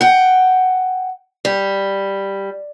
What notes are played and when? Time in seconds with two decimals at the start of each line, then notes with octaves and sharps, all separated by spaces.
0.01 F#5 G5
1.45 G3